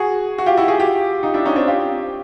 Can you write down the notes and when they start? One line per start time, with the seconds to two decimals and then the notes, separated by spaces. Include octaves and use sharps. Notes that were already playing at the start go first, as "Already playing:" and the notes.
Already playing: F#4 G#4
0.38 F#4
0.46 F4 G4
0.57 E4 F#4
0.68 F#4 G#4
0.79 F4 G4
1.23 D#4 F4
1.34 D4 E4
1.45 C#4 D#4
1.56 C4 D4
1.67 F4 G4